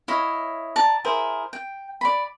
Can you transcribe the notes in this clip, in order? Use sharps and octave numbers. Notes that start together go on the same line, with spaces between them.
E4 C#5 D#5 F5
D5 A5 A#5
E4 G#4 A#4 C5
G5
D5 B5